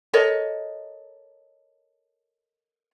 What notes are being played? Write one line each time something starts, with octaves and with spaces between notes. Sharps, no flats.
A4 A#4 C#5 D#5